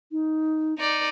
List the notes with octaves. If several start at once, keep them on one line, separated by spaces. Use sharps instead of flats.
D#4
D#4 D5